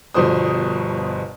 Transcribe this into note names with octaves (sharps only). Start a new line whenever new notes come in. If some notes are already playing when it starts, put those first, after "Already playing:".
G1 G2 B2 F3 C5 D#6